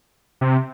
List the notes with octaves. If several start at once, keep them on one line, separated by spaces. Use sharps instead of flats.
C3